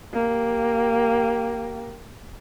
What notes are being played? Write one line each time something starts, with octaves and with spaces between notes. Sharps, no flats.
A#3 G4